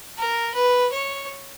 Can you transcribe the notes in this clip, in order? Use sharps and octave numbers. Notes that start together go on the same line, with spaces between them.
A#4
B4
C#5